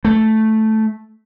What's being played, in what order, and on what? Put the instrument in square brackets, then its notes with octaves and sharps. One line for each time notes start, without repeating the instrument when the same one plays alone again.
[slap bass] A3